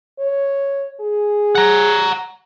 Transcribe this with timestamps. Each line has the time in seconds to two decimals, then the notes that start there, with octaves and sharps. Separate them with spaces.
0.19 C#5
1.01 G#4
1.55 F#5 A#5